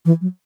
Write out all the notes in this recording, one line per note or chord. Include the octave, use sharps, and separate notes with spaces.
E3
F#3